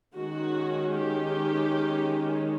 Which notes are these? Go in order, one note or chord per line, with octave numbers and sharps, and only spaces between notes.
D#3 G#3 C#4 F#4
G4